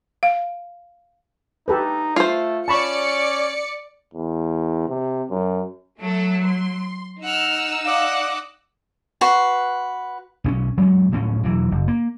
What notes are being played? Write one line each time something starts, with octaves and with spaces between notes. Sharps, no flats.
F5
D#4 G4 A4 B4
A3 F4 C5
C#4 D5 A5 B5 C#6 C#7
E2
C3
F#2
F#3 A3 A4
C6
D#4 F#5 E6 F6
D5 D#5 F5 F#5 D6
F#4 B4 C6
B1 C4 C#4
F#3 G#3 C4 C#4
D1 A2 F3 C#4
E1 E3 F#3
F#1
A#3